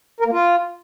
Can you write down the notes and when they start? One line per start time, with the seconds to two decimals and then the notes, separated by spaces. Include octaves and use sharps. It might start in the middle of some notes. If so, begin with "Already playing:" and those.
0.20 A#4
0.26 A#3
0.32 F4